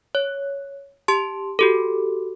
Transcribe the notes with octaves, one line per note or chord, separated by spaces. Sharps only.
C#5
G4 A5 C6
F#4 G4 A4